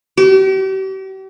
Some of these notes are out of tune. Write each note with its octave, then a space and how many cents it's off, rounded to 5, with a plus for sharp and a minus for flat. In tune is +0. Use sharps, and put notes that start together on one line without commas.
G4 -40